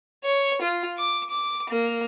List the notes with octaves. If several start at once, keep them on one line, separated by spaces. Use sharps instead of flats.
C#5
F4
D6
D6
A#3